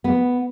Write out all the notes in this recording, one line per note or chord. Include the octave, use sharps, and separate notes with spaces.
B3